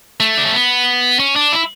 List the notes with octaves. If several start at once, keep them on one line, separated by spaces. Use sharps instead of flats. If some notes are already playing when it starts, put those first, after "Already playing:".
A3
D4
C#4
B3
C#4
D4
E4